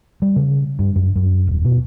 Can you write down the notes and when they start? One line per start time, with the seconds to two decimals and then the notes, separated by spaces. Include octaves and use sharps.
0.22 G3
0.36 C#3
0.79 G2
0.96 F#2
1.16 F#2
1.47 D#1
1.65 B2